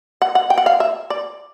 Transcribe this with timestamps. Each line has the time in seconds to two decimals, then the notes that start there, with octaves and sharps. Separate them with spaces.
0.22 F#5
0.35 F#5
0.50 G5
0.58 F#5
0.66 F5
0.80 E5
1.10 D5